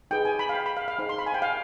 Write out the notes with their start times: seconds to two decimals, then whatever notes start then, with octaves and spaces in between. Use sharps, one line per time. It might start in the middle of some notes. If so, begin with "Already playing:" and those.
0.11 D#4 G#4 B4 G5
0.25 G#5
0.39 B5
0.49 F5
0.55 G5
0.66 B5
0.77 F5
0.88 F5
0.99 D#4 G#4 C5
1.09 C6
1.19 B5
1.26 G#5
1.34 G5
1.42 F5